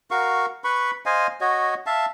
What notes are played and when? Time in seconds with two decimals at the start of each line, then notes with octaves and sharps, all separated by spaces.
0.11 F#4 A#4 F5 C#6
0.64 B4 B5 C#6
1.06 C5 D#5 F5 G#5
1.41 F#4 C#5 D#5
1.86 E5 F5 A5